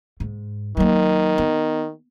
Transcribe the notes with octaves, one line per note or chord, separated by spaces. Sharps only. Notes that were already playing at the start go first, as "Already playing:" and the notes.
G#2
D#3 F#3 A#3
B3